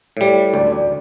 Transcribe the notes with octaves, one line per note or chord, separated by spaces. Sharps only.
A2 G3
D2 D5
D5